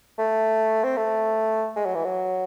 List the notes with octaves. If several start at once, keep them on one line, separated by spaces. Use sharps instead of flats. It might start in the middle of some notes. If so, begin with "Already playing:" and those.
A3
C4
A3
G#3
F#3
E3
F#3